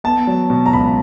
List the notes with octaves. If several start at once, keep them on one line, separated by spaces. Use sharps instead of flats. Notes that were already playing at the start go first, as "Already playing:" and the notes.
B3 A5
F#3
B2
A#5
C#2 B5